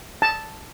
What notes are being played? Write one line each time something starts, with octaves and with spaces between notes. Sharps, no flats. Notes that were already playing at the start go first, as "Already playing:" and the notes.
A5